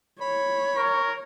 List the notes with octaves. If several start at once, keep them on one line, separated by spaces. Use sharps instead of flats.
C#5 B5
A#4 C#6